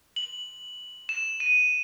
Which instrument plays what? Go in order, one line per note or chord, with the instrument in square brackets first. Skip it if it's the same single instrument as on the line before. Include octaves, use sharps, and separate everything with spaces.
[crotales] F#7
E7
D#7